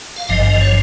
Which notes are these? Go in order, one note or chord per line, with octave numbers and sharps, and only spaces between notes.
F5
G#1 G2 F3 D#5
D#5
C#5